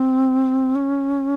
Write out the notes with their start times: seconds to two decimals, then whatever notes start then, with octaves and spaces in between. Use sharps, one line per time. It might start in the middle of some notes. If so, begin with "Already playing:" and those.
Already playing: C4
0.75 C#4